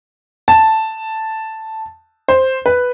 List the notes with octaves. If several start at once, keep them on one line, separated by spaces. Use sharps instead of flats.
A5
C5
B4